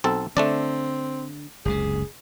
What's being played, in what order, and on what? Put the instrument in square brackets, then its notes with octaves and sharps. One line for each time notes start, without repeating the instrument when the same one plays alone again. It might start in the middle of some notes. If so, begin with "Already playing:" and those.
[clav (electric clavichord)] B1 C4 A4
[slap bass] D3 [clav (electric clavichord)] A3 D4 D5 [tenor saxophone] C4
[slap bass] F#1 C#2 C3 [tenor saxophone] G#4